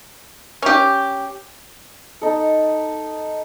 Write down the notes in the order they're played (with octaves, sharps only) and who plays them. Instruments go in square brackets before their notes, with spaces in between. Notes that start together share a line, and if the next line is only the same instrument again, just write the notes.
[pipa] C#4 G4
[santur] D#4 A4